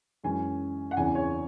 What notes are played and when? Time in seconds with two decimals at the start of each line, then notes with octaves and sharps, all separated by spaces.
0.24 F#2 E3 G#3 C#4 G#5
0.91 F#5
0.97 E2 C#3 E3 C4 G#5
1.15 C#5